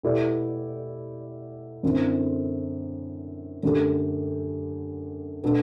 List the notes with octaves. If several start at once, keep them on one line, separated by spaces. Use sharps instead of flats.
B2 A3 E4 G4 D5
F#2 D3 A3 C4 E4
F#2 D3 A3 D4 G4
B2 A3 D4 A4